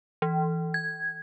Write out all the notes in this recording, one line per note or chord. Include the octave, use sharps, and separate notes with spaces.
E3
G#6